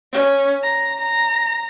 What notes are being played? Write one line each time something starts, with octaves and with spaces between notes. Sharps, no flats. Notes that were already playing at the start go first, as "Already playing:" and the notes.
C#4
A#5
A#5